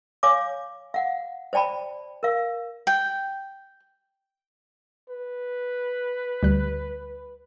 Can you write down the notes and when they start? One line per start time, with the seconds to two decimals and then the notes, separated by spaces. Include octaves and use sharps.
0.23 C#5 F5 G#5 D6
0.94 F5 F#5
1.53 C5 D5 G5 A5 B5
2.23 A#4 F5
2.87 G5
5.09 B4
6.43 D2 G3 F#6